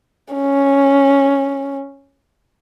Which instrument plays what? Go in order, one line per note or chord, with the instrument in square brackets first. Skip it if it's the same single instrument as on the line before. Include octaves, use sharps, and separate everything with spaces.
[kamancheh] C#4